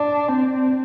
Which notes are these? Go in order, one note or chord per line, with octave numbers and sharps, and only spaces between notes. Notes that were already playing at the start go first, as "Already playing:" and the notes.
Already playing: D4
C4